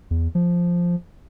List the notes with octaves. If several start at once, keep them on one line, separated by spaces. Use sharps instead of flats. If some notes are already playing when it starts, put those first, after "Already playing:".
E2
F3